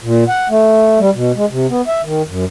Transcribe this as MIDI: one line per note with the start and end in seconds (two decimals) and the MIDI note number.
0.03 0.24 46
0.28 0.48 78
0.49 0.99 57
0.99 1.10 55
1.14 1.32 47
1.36 1.46 56
1.51 1.67 48
1.69 1.81 59
1.87 2.02 76
2.04 2.22 51
2.27 2.45 42